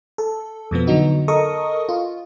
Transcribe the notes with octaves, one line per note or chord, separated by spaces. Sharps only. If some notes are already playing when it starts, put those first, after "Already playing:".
A4
F2 B2 F3 B3
D3 F#3 B3 D#4 F#4
A4 A#4 D#5 C#6 D#6
F4